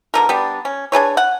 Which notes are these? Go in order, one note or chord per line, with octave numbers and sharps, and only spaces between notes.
B2 D3 A#4
G3 B3 D4
C#4
D4 G#4 B4 C#5
F#5